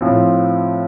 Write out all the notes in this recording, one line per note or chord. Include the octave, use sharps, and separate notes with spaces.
A2 F3 C4